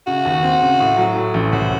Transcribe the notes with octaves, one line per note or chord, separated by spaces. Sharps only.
C#3 F#4
D#2
C4
C#3
A2
F#3
A2
A1
C2 F#4